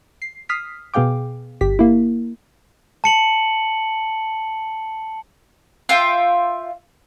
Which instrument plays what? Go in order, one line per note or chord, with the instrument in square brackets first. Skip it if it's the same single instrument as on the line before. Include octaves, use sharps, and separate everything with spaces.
[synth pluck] C7
D#6 F6 B6 C7
B2 B3 G#4 F5 G5 D6
G1 G4 B6
A#3 E4
[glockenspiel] A5 C#7 F#7
[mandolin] F4 E5 G5